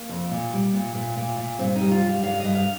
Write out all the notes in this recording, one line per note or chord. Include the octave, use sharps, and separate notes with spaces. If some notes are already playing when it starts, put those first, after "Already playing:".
Already playing: A#3
F2
A#2
G3
A#2
A#2
A#2
A#2
G2 C4
D#4
G3
F4
G3 F5
G2 F5
G2 D#5
F5